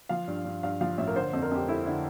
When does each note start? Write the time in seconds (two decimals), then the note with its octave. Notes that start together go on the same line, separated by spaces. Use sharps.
0.09 F3 F5
0.27 G2
0.45 G2
0.63 G2 F5
0.81 F3 F5
0.97 A1 E5
1.07 A#4
1.15 D3 C5
1.33 F2
1.42 A#4
1.51 F2 G4
1.68 A3 E4
1.86 D3 E4